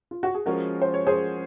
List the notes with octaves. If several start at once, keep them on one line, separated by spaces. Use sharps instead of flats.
F4
F#4
G#4
F3 G#3 C#4 F4 F#4 A#4
C5
C#5
G#4 C5